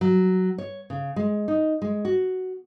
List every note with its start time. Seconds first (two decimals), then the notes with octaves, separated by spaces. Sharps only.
0.01 F#3
0.58 C#5
0.90 C#3
1.16 G#3
1.48 D#4
1.82 G#3
2.05 F#4